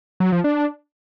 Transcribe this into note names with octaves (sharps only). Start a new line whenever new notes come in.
F#3
F3
D4